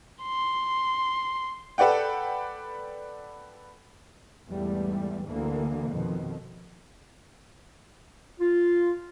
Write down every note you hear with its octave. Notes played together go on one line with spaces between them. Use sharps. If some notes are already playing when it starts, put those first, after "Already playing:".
C6
A4 B4 D5 F#5 G5
E2 G#2 E3 G3 A3
D2 D3 E3 A#3
F2 B2 D#3 F3
F4